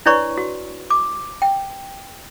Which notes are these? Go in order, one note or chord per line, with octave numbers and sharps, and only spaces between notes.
D4 E4 B4 C#5 D5 C#6
F#4
D6
G5